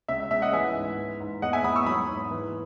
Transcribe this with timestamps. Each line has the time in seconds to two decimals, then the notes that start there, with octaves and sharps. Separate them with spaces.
0.08 C#2 E5
0.20 E5
0.31 C#2 E5
0.42 D#5 F#5
0.53 E3 E5 G#5
0.75 G#2
0.98 E3
1.20 G#2
1.42 E2 D#5 F#5
1.53 E5 G#5
1.64 E2 B5 D#6
1.76 C#6 E6
1.86 F#3 B5 D#6
2.09 G#2
2.31 E3